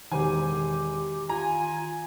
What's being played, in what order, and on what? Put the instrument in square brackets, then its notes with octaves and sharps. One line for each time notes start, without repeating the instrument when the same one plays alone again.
[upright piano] E1 C5 G#5 [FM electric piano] D#3 [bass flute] G4
[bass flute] F4 [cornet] G#5 [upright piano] A#5